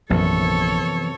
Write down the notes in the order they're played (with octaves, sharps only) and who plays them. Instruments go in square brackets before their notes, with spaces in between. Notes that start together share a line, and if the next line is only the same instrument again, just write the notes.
[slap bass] A#1 [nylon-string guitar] F#2 C3 [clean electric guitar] E3 F3 B3 [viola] A4 C#5